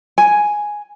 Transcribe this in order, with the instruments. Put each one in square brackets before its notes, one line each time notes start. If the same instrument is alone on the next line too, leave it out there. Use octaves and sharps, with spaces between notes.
[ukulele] G#5